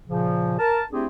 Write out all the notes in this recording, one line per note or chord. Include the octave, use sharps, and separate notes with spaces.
A#2 C#3 F3
A#4 A5
A3 C4 D4 E4 G4 G#4